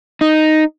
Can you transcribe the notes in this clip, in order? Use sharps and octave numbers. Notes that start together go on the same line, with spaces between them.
D#4